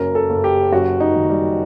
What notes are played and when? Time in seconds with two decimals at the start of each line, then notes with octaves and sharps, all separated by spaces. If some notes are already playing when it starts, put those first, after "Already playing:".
Already playing: F#1 F#2 A#4
0.15 A4
0.30 F#1
0.44 G4
0.72 F#2 F#4
1.00 D#4
1.16 D#3
1.30 G3